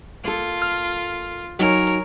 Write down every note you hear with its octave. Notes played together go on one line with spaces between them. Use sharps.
A#3 F4 A4
F6
F#3 D#4 F#4 A#4 C#5 G#5